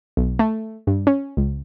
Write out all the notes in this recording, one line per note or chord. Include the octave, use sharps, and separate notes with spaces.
B1
A3
G2
C#4
C#2